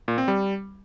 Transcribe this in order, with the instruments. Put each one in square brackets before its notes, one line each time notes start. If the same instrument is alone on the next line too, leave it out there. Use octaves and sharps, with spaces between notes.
[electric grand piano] A#2
C4
G3